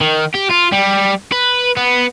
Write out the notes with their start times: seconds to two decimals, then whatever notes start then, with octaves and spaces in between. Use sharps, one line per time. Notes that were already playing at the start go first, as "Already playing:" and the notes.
0.01 D#3
0.35 G4
0.51 F4
0.72 G3
1.32 B4
1.77 B3